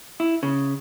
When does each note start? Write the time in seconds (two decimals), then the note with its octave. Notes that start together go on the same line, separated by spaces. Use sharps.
0.20 E4
0.43 C#3